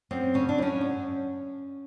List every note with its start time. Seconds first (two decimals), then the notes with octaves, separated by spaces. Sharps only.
0.11 F#2 C4
0.34 C#3 C#4
0.49 D4
0.58 F#2 C#4
0.81 F#2